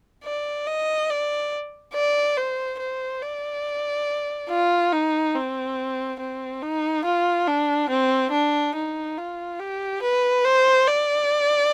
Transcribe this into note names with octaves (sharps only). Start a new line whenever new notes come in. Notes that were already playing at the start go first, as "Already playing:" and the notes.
D5
D#5
D5
D5
C5
C5
D5
F4
D#4
C4
C4
D#4
F4
D4
C4
D4
D#4
F4
G4
B4
C5
D5